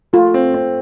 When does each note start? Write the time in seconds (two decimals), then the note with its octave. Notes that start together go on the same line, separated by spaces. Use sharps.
0.13 A3 F4
0.34 C4
0.54 C4